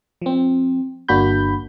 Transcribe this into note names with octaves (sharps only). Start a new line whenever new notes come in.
F3 C4
G1 A#3 D4 F#4 B5 G6